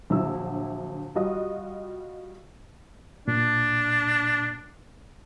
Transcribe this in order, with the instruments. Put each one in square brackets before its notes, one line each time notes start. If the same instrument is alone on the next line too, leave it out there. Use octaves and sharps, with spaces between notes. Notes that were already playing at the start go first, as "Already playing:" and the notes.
[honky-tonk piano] A#1 D3 F#3 E4 E6
G3 F4 F#4 D#5 D#6
[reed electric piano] A#2 [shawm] D4